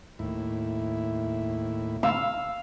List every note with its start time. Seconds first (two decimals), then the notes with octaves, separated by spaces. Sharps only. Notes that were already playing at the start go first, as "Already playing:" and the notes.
0.19 D#2 A2 E4
2.03 F5 E6